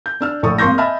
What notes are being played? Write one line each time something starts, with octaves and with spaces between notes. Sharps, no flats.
G6
D4 E6 F6
A#1 A2 A4 C#6 D#6
G#1 A#3 C6 C#6 G6 A#6
D#5 E5 G#5 A5 B5 F6